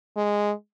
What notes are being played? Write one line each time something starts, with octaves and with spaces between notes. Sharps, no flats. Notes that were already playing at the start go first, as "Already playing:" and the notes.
G#3